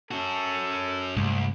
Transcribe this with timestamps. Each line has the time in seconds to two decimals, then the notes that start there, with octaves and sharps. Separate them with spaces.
0.11 C#4 F#4 A4
1.16 C2 G2 G#3 A3